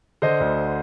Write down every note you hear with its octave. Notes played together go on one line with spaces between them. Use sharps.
D3 C5 D#5
D2